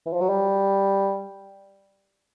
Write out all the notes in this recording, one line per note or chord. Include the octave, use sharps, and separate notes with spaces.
E3
F3
F#3
G3